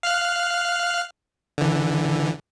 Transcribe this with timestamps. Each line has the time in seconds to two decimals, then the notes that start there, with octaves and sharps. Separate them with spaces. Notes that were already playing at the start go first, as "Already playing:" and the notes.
0.03 F5 F6 F#6
1.58 D3 E3